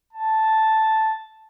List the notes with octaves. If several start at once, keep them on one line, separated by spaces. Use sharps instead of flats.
A5